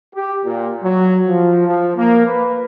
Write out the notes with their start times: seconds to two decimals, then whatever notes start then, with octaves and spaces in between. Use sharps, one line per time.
0.14 G4
0.44 A#2
0.83 F#3
1.27 F3
1.67 F3
1.96 A#3
2.26 B4